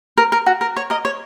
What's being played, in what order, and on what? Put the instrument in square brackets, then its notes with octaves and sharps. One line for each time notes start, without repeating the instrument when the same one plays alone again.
[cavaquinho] A#4
A#4
F#4
A#4
C#5
A#4 D#5
C#5